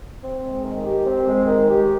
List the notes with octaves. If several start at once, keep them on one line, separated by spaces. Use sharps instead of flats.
C4
G#3
D#3
G4
C4
G#3
D#3
G4